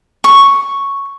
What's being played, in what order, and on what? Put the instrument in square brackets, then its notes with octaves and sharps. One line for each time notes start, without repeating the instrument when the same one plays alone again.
[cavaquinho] C#6